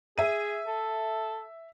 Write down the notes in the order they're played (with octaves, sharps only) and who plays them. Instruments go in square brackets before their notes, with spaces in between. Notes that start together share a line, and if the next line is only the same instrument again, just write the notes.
[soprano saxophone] G#4 [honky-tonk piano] E5 D#7
[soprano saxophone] A4